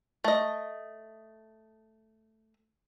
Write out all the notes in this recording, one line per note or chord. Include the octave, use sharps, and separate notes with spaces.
A3 D#5